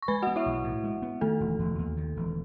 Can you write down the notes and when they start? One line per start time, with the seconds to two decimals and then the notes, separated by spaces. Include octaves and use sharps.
0.02 C#6
0.08 G#3 B4 B5
0.22 F#4 F#5
0.27 B3
0.36 E4 E5
0.46 B1
0.64 A2
0.84 G#3
1.02 B3
1.21 D#3 A3 A4
1.40 E1
1.59 E1
1.78 D#2
1.97 D#3
2.16 E1